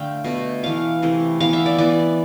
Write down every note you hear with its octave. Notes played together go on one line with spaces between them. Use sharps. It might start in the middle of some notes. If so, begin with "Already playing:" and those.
Already playing: D3 A3 F5 G5
B2 A3
E3 A3 F5
C3 E3 A3
E3 B3 F5
E5
D5
E3 B3 D5